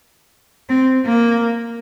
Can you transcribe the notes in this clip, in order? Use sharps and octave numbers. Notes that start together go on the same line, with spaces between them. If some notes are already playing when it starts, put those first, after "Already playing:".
C4
A#3